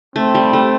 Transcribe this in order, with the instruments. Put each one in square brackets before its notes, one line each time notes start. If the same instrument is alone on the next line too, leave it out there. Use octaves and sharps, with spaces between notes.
[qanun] A3 [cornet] C4
[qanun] G3
A3